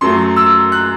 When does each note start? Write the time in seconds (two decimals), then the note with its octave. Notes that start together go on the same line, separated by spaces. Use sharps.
0.01 F#2 F#3 A3 C6
0.36 E6
0.72 F#6